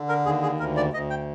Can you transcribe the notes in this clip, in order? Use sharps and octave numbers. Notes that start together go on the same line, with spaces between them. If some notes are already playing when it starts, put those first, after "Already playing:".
Already playing: D3
A#4
D#2 G#4
G#4
D2 A#4
D5
D2 D#5
G5